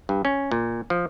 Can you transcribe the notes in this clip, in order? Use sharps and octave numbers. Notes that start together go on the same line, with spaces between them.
G2
C#4
A#2
F3